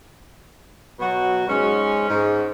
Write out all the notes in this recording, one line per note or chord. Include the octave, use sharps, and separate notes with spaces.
B2 F#3 F#4
G#2 G#3 C#4
G#2